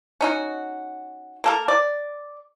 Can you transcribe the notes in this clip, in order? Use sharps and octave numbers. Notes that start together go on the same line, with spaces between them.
C#4 D#4 F#4
A#3 A4 A#4
D5